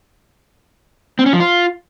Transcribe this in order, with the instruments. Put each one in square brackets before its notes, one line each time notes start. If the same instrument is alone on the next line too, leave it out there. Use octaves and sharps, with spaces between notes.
[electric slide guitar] C4
C#4
F3
F4